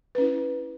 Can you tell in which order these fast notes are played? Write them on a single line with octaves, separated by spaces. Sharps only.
B4 C#4 E4